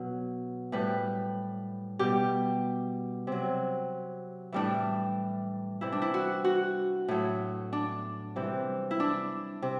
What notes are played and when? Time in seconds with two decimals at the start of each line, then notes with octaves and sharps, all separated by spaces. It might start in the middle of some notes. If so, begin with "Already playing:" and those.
Already playing: B2 F#3
0.72 A2 G3 B4
1.99 B2 G3 G4
3.27 C3 F#3
4.52 A2 E3 G3 D4
5.81 C3 E3 G3 E4
5.92 D4
6.02 E4
6.14 F#4
6.44 F#4
7.08 A2 F#3
7.73 D4
8.36 C3 E3 G3
8.91 E4
9.00 D4
9.62 C3